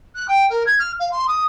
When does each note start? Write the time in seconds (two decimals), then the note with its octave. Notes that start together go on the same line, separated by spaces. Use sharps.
0.15 F#6
0.28 G5
0.49 A#4
0.66 G#6
0.79 F6
0.99 F5
1.12 C6
1.28 D#6